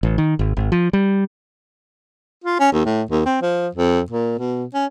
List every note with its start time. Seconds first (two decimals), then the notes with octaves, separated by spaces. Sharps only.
0.03 A1
0.18 D#3
0.39 G#1
0.57 G#1
0.72 F3
0.93 G3
2.44 F4
2.60 C#4
2.73 D#2
2.86 A2
3.10 D#2
3.26 C4
3.42 F3
3.75 F2
4.10 A#2
4.39 B2
4.74 C#4